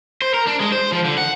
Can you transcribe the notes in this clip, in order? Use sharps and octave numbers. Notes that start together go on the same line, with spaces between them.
C5
A#4
D4
G#3
C5
F3
D3
F#5